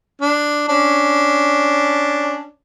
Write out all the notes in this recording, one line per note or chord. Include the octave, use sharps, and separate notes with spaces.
D4
C#4 D4